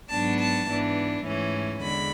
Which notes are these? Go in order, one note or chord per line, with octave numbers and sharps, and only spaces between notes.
G#2 F#3 B3 D4 A5
A5
G#2 E3 B3 D4
G#2 E3 A3 C#4
E2 D3 G#3 B5